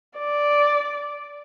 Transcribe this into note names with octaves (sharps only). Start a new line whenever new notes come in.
D5